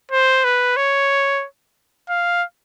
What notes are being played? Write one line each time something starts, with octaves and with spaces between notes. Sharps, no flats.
C5
B4
C#5
F5